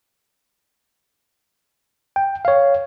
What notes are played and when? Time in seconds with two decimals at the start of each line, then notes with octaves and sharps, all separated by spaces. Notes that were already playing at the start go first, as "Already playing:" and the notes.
2.16 G5
2.45 C#5 F5